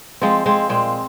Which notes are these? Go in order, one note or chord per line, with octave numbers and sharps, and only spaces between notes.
F3 G#3 C4
F3 G#3 C4
A#2 G#3 C4